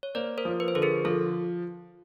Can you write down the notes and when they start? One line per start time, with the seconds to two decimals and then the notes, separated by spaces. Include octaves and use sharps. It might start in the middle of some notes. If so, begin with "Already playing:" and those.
0.03 C#5
0.15 A#3 C5 D5
0.38 A#4 C5
0.45 F3
0.60 B4
0.68 C5
0.74 D3 A4 B4
0.82 G#4 A#4
1.05 F3 A4